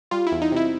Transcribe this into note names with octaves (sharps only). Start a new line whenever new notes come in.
G3 F4
E4
E2
D#4
C3 E4